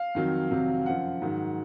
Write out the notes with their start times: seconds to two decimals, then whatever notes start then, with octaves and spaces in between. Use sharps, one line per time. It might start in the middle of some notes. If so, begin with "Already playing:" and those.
Already playing: F5
0.15 F2 D#3 F#3
0.50 F2 C3 D#3 F#3
0.86 F#2 F3 F#5
1.22 G#2 D#3 F#3